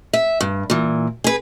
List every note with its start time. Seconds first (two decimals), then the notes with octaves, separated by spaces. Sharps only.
0.13 E5
0.41 G2
0.70 A#2 E3
1.24 G#4 B4